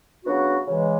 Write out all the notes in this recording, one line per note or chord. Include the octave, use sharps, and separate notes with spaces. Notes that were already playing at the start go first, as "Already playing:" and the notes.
C#3 F#3 B3 D4 F#4
C#3 E3 G#3